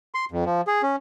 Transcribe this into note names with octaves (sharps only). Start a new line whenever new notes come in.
C6
F2
F3
G#4
C#4